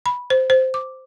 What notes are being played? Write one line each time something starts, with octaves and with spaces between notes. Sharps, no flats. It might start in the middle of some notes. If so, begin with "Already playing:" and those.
B5
C5
C5
D6